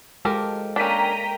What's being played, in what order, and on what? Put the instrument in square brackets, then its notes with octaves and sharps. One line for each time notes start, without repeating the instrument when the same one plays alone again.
[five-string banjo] F3 G4 A#4 [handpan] G#3 A4
[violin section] A#3 A#5 [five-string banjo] C#4 D4 [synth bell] G5 B6 D#7